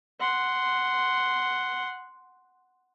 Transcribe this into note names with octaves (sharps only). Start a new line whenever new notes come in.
F#5 C6